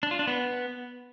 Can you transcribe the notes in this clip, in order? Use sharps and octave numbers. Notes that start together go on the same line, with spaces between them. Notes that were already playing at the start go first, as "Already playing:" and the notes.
D4
F4
D4
B3